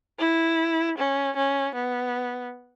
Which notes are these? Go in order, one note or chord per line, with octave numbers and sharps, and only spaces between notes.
E4
C#4
C#4
B3